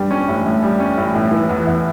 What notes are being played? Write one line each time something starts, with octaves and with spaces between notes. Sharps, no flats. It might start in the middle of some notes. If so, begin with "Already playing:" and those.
Already playing: G2 G3
C#4
A1
A2
G3
C#4
A1
A2
E3
E2
E2